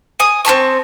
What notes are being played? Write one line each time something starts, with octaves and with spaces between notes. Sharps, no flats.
G#5 D#6
C4 G4 A5 C#6